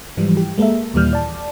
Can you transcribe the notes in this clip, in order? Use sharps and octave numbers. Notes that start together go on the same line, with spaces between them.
G#2 E3 F3 G3
G4
G#3 A#3 A4 A#4 E5
D#2 A#2 E3 G3 F6 G6
D5 A5